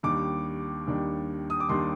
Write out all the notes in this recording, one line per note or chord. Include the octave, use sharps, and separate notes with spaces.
D#2 D#3 G3 D4 D6
D#2 D#3 G3 D4
D#6
D6
D#2 D#3 G3 D4 C6